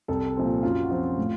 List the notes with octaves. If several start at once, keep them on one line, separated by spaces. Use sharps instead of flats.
C2 A4
A#2 F3 C4
F4
F#2 F4
F#4
F3 C4 F4
A2